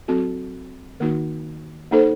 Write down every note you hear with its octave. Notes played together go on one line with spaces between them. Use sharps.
F#3 C4 F#4 A4
D#3 A#3 D#4 F#4
A#3 D#4 A4 C5